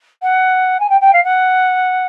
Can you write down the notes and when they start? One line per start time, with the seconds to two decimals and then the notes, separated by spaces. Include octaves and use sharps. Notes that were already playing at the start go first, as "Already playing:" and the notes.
0.22 F#5
0.80 G#5
0.90 G5
1.01 G5
1.13 F5
1.24 F#5